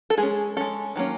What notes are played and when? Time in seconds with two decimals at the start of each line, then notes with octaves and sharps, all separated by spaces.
0.10 A4
0.18 G#3 C#4 G#4
0.57 G#3 C#4 A4
0.96 D#3 F#3 A#3 C#4